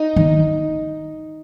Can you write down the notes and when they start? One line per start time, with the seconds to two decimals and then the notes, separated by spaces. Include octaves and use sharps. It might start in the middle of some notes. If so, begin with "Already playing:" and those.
Already playing: D#4
0.16 D#3